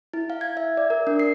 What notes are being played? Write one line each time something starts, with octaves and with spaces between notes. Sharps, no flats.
E4
F5
G#6
E5
D5
A#4
D4
C7